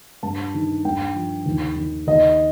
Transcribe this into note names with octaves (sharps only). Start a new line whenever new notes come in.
G2 A5
D#3
G2 G5
F3
D#2
D#3
D#2 D#5